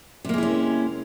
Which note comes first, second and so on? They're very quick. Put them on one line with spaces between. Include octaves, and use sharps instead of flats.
C3 A#3 G#3 E4 C#4